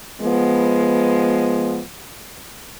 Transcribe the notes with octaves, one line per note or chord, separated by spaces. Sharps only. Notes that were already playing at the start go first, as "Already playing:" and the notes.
F3 G#3 B3